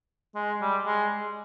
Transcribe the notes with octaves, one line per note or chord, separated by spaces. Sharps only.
G#3
G3
G#3